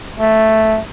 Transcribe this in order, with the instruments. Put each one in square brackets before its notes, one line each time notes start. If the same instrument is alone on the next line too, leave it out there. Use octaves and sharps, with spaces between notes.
[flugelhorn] A3